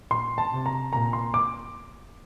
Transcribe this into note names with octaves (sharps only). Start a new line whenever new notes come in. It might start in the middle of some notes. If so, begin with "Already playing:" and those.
A#2 C6
A5
C3
A#5
A#2 A#5
C6
D6